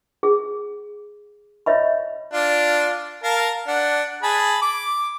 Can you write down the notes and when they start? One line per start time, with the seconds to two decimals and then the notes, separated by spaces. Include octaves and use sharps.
0.23 G#4
1.66 C#5 D#5 E5 B5
2.33 D4 F4
3.23 A#4 F5 A5
3.67 D4 F#5
4.23 G#4 A5 B5
4.62 D6